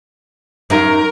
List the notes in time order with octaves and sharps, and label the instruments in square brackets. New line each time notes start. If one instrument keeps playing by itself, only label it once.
[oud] F#2 D#4 [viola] A#4